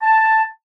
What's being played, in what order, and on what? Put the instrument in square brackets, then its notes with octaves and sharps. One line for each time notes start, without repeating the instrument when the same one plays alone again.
[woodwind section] A5